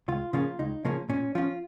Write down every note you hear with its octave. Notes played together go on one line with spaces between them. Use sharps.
C#2 F4
C#3 F3 A#3 C#4 F4
C#2 D#4
C#3 F3 A#3 C#4
A#2 C#4
F3 C#4 F4